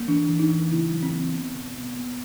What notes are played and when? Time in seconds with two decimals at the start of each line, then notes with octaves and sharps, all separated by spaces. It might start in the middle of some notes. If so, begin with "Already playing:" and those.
Already playing: A#3
0.08 E3 D4
0.29 E3
0.40 D#4
0.50 E3
0.71 C#3 E4
0.92 F#3
1.03 C4
1.13 A#3
1.34 B3
1.55 B2
1.76 B3
1.97 B3